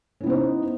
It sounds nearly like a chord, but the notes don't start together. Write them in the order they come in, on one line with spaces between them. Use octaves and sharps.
C#4 E4 B3 C5 D#4